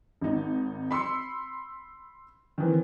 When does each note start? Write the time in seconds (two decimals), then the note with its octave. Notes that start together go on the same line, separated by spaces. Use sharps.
0.21 G#1 D#4
0.91 B5 C6 E6 C#7
2.58 D#3 E3 C4